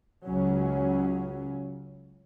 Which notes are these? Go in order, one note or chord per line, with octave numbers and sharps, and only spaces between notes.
C#2 C#3 F#3 C#4